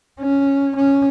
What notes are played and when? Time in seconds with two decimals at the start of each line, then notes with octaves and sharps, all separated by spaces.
0.20 C#4
0.76 C#4